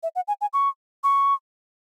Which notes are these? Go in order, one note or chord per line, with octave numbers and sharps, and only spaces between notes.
E5
F#5
G#5
G#5
C#6
C#6